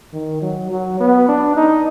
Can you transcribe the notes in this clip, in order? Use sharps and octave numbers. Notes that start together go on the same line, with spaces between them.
D#3
F#3
F#3
B3
D4
D#4